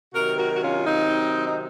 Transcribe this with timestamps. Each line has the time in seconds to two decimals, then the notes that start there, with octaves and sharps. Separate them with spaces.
0.14 C3 D#3 F#3 F#4 A#4
0.38 F#4 A#4
0.54 F#4
0.62 C#4 F4
0.86 C4 D#4
1.46 D#4